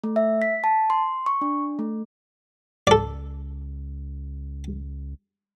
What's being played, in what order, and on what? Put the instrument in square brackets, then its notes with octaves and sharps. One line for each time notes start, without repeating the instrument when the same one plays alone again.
[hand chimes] A3
E5
B6
A5
C6
C#6
D4
A3
[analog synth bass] C#2 [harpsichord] A4 D5